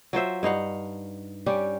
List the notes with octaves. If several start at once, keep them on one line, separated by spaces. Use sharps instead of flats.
F#3 F4 C5 E5
G2 D#4 F5 F#5
G3 C#4 G4